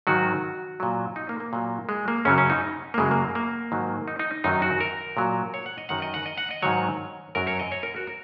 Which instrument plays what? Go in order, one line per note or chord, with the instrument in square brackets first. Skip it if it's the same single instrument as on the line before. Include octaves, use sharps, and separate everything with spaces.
[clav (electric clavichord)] G#2 D#3 F#3 F#4
A#2 F#3
D#4
A#3
A#3
A#2 F#3
G#3
A#3
F#2 C#3 F#3 C#4
C#4
D#4
A#3
F#2 C#3 F#3 G#3
A#3
A#3
G#2 D#3 F#3
D#4
D#4
F#2 D#3 F#3 D#4
F#4
A#4
A#2 F#3
C#5
F#5
D#5
F#2 D#3 F#3 F#5
D#5
F#5
D#5
F#5
D#5
G#2 D#3 F#3 C#5
F#2 F#3 A#4
C#5
D#5
C#5
A#4
F#4
A#4